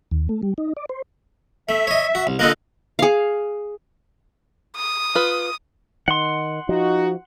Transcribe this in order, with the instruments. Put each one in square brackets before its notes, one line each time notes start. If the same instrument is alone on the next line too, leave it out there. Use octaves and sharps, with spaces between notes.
[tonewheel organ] D#2
A3
G3
D#4
D5
C5
[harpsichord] A3 [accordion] E5
[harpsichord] C#5 D#5
F#4
C2
[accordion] D3 D#5 F#6 [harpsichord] A#3 F4 A4
[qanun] G#4 F5
[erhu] D#6
[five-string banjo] F4 B4
[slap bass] D#3 [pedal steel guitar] F#5 C6
[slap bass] F3 [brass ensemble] D#4 F#4